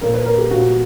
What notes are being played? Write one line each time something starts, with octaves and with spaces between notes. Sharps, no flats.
A#2 F3 A#4
B4
A#4
G4
A#2 F3 F#4